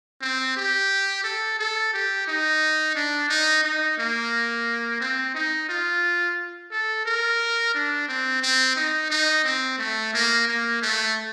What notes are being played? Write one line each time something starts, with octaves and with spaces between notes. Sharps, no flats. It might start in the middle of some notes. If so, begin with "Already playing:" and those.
C4
G4
A4
A4
G4
D#4
D4
D#4
D#4
A#3
C4
D#4
F4
A4
A#4
D4
C4
C4
D#4
D#4
C4
A3
A#3
A#3
A3